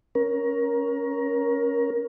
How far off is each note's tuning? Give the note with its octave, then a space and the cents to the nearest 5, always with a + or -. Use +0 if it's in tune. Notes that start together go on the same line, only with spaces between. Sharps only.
C#4 +0 A#4 +20